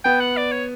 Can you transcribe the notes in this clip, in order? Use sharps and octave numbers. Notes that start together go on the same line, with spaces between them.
B3 G5
F#5
D5
C#5